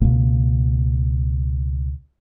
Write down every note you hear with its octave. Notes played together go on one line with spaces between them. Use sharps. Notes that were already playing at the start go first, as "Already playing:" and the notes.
C#2 B2 A#3